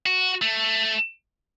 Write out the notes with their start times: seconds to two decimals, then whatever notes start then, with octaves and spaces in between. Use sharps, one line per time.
0.06 F#4
0.42 A3